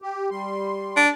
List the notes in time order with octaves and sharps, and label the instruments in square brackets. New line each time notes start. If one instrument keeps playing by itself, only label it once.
[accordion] G4
G3 C6
[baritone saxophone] D4